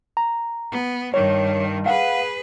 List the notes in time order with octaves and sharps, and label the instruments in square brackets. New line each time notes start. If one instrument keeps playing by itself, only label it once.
[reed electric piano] A#5
[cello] B3
[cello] G2 D#3 [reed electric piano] C#5
[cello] G#4 B4 [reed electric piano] F5 F#5